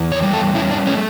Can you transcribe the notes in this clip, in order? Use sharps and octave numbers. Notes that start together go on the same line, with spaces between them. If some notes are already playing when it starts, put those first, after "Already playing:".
Already playing: E2
C#5
G3
A4
C#4 E4
D4
A3 C#4